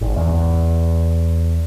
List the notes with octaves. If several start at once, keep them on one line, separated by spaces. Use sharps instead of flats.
G#1
E2